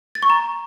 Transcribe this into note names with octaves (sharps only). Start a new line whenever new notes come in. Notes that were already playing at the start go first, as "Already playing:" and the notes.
A6
C#6
A#5